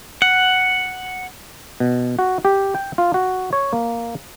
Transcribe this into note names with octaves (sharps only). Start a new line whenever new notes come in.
F#5
B2
F#4
G4
G5
F4
F#4
C#5
A#3